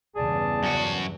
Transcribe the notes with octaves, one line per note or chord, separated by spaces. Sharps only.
E2 G2 C#3 G#4 D5 A5
F#2 F#4